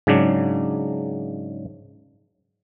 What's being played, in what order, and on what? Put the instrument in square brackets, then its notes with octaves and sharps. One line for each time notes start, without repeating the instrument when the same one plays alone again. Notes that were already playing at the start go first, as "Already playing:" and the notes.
[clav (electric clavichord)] G#2 C#3 F#3 D4